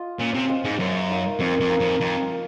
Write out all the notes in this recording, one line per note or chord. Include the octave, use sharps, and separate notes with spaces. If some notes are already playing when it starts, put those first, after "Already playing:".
Already playing: F4 D#5
A#2 C#4
C3
F4 C5 D#5
G#2
F#2 A#3
D#4 A#4 F5
F2 A#3
F2
D#4 A#4 F5
F2
F2 F3
A#3 F4